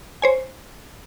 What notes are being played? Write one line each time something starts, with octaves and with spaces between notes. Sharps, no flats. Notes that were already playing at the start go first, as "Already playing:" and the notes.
C5 C#5 G#5